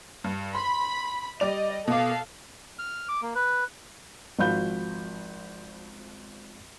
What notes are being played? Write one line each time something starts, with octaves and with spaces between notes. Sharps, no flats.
G2
B5 C6
G3 D5 D#5 F7
B2 A4 F5 D6
F6
D6
A#3
B4
G#1 F3 F#4 F5 B5 G6